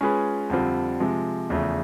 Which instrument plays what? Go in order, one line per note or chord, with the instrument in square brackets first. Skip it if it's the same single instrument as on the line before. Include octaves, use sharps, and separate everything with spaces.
[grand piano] G#3 C#4 F4 G#4 B4
F2 D3 G3 C4 F4
C3 F3 G#3
E2 C#3 F3 A3